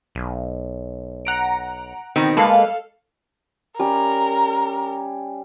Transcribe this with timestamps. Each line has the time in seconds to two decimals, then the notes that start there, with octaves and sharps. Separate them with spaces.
0.15 B1
1.25 F#5 A#5 D7
2.16 B2 D#3 C4
2.37 G#3 A#3 A4 B4 F5
3.79 G3 C#4 A#4